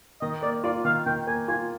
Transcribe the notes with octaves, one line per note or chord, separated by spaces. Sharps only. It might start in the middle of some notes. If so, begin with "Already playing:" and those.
D#3 D#5
A#3 D5
F4 D5
D#3 F5
D#3 G5
A#3 G#5
F4 G#5